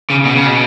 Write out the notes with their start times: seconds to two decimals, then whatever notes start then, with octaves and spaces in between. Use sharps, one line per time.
0.10 C#3
0.25 B2
0.36 C#3
0.47 B2